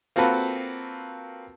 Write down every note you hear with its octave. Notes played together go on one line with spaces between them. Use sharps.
A#3 C4 F4 F#4 A4 B4